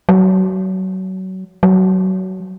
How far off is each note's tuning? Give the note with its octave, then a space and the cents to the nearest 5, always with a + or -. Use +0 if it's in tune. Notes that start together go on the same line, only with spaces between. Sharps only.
F#3 +25
F#3 +20